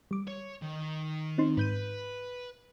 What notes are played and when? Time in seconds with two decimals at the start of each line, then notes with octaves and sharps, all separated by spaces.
0.11 G3 D6
0.28 C#5
0.62 D#3
1.38 C4 D#4 C6
1.57 G#2 B4 G6 D#7